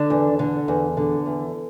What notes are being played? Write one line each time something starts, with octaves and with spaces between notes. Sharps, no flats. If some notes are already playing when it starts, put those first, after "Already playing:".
Already playing: D3 D4
E2
D3
E2
D3
E2